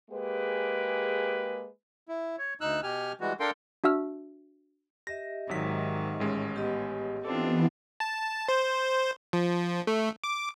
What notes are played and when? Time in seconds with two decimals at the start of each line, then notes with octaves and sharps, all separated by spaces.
0.10 G#3 A#3 G4 G#4 B4
2.09 E4
2.38 C#5
2.61 D2 D#4 E6 F#6
2.83 B2 G4 G#5 F6
3.21 E3 G3 G#3 F#4
3.40 D4 A4 A#4 F5 G5 C6
3.84 D4 F#4 E5 E6 F6
5.07 G4 D#5 E5 A#6
5.49 G#1 G#2 D#3 F#3 B6
6.20 A1 G#3 C#4
6.56 B3 G4 D#5
7.25 E3 B3 C4 D4 F4 A4
8.00 A5
8.48 C5
9.33 F3
9.87 A3
10.24 D6